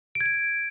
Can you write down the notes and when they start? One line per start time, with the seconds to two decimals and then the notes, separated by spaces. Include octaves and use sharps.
0.15 D7
0.21 G#6
0.26 D7